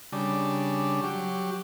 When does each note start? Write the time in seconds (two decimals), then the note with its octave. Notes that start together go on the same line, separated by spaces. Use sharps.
0.12 C#3 G3 D4
1.04 F#3 G4